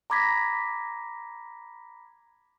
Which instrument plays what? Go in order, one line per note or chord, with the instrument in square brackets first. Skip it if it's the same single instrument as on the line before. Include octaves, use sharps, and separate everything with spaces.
[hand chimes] A#5 B5 D6 G#6 A#6 B6